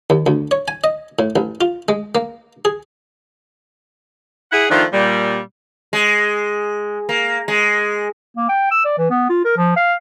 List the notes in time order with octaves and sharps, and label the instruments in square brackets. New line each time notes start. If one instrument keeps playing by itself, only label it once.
[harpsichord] D#2
D2
C#5
G#5
D#5
A2
A1
F4
G#3
A#3
G#4
[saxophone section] E4 G#4 F#5
D#3 F3 A3 D4 F4
A#2 G3
[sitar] G#3
A#3
G#3
[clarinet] A#3
G5
E6
D5
E3
B3
F4
A#4
F3
F5